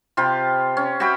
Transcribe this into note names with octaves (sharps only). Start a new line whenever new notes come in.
C3 F4 G4 B5
C#4
F#4 G4 E5 B5